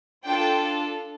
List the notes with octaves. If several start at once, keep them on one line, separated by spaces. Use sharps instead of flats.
D4 F4 A4 G5